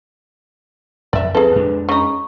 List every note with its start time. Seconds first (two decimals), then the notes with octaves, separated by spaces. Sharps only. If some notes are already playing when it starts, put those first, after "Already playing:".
1.13 F2 D5 E5
1.35 C2 F2 C4 G#4 A4 B4
1.56 F2 G#3 D4
1.89 C#3 D#4 C#6